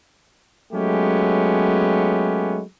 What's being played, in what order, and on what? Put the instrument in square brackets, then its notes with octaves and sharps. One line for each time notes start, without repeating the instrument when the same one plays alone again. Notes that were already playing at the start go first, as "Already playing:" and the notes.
[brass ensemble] F#3 G#3 A3 B3 C#4 G4